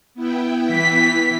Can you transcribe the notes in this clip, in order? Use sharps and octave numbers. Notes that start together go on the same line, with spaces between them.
B3 E4 G5
E3 B6